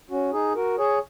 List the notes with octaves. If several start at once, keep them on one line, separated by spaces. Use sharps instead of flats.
C#4 F#4
D#4 G#4
F#4 A#4
G#4 C#5